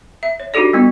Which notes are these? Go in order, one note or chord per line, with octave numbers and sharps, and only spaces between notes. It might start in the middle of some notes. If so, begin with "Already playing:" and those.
E5
C#5
D4 D#4 F#4 G4 A4 D5
G3 B3 F4